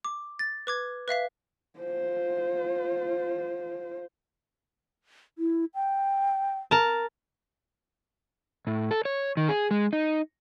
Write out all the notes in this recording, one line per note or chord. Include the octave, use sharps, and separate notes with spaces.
D6
A6
B4 D6 G#6
B4 E5 F5 B6
F4 C5
E4
G5
A#4 A5
A2
A4
C#5
D#3
G#4
G#3
D#4